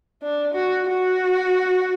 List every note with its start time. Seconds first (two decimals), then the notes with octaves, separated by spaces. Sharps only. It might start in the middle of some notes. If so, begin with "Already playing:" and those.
0.23 D4
0.55 F#4
0.87 F#4